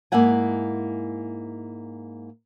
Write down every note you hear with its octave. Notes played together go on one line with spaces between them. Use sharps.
G#2 A#3 E4 E5 F#5 G#5